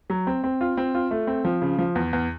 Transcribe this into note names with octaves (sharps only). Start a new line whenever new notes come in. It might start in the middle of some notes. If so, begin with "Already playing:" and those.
F#3
C4
C4
F4
C4
F4
A3
C4
F3
C#3
F3
E2
E2